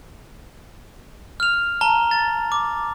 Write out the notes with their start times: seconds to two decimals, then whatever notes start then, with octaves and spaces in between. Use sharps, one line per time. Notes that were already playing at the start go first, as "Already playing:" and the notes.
1.40 F6 F7
1.81 A5 A#5 G7
2.11 A6
2.52 D6